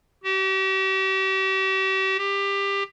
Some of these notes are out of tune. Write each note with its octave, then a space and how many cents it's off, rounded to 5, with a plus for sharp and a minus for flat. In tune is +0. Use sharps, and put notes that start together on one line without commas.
G4 -40
G4 +20